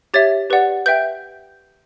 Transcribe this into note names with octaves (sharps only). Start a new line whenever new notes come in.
G4 C#5 E5 A6
G4 B4 D5 F#5
B4 E5 G5 G6